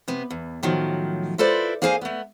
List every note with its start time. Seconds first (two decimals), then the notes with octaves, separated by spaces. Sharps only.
0.08 C3 B3
0.30 E2
0.63 A2 D#3 F3 F#3
1.38 E4 F4 A4 B4 C5 D5
1.82 A#3 G#4 C5 F5 F#5 G#5
2.01 A3 B3